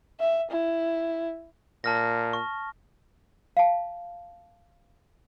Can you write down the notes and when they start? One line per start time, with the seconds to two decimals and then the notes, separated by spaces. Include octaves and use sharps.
0.20 E5
0.51 E4
1.84 A#2 A5 F6 A#6
2.33 C#6
3.57 F5 A5